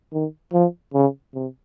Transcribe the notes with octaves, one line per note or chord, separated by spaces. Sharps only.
D#3
F3
C#3
C3